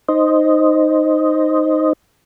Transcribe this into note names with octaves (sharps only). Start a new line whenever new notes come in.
D#4 C5 D#5